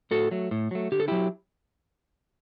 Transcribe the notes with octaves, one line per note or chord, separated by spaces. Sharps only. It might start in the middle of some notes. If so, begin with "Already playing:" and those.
A2 F#4 A4
F#3 A3
A2
F#3 A3
D3 G4
A4
F#3 E4 G4